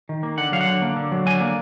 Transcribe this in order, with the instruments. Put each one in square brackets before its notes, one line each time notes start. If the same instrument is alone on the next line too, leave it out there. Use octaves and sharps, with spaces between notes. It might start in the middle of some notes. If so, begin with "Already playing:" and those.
[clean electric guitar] D#3
A#3
D3 F#5
F#3 F5
F#5
D3
A#3
D3
F#3
D3 G#5
A#3